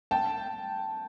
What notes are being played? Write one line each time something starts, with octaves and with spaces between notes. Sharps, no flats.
G5 A5